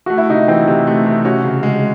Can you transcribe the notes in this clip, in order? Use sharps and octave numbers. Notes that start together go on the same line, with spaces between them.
A3 F#4
E4
C3 D#4
E3 C4
C3
A3
C3
C#4 F#4
C#3
G#3